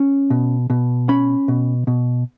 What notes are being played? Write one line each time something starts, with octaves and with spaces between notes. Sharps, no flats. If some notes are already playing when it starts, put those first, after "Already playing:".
Already playing: C#4
B2
B2
C#4 B5
B2
B2